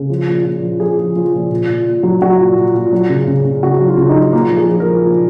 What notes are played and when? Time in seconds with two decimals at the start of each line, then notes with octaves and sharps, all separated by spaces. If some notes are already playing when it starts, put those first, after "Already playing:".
Already playing: C#3
0.10 F3
0.27 A#2
0.45 A#2
0.63 F3
0.80 F3 G#4
0.98 F3
1.16 F3
1.34 A#2
1.51 A#2
1.68 A#2
1.87 A#2
2.03 F#3
2.22 F#3 F#4
2.39 A#2
2.57 A#2
2.74 A#2
2.93 F#3
3.09 C#3
3.27 C#3
3.45 C#3
3.63 C#3 F#4
3.80 F#3
3.87 F4
3.98 C#3
4.09 D#4
4.16 F#3
4.33 A#2 A#3
4.51 F3
4.57 G#4
4.69 F3
4.80 A#4
4.86 F3
5.04 A#2